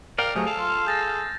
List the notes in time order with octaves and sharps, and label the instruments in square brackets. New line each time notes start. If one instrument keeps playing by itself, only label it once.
[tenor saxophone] A#4 [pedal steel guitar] D5 F5 G5
[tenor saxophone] C3 [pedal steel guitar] F#3 A3 [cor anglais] G#4
[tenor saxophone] A4 [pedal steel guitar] F5
[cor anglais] F4
[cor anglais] G#4 [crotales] G6 A6 A#6